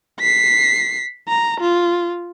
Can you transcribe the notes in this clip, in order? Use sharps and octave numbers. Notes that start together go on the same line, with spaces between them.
B6 C7
A#5
F4